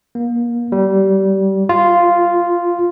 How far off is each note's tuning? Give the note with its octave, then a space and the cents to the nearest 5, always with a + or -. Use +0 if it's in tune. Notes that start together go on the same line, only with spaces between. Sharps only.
A#3 +30
G3 -25
F4 -5